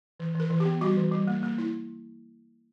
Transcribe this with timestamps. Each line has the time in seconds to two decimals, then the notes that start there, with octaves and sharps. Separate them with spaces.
0.20 E3
0.35 E3 A#4
0.50 E3
0.60 G4
0.65 B3
0.81 G3 F#4
0.97 E3
1.11 G3
1.27 A#3
1.43 A#3
1.58 E4